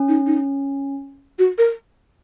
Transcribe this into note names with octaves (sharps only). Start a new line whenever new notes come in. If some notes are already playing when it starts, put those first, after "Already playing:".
Already playing: C#4
D#4
D#4
F#4
A#4